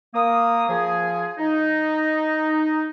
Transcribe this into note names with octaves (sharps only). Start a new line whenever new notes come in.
A#3 D#6
F3 G#4
D#4